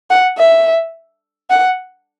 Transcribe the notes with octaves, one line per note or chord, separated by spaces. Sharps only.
F#5
E5
F#5